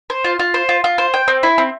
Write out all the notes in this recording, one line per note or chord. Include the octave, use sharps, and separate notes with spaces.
C5
F4
F4
C5
F4
F4
C5
G5
C4
E4
C4